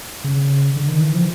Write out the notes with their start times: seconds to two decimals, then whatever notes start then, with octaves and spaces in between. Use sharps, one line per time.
0.24 C#3
0.76 D3
0.88 D#3
1.01 E3
1.14 F3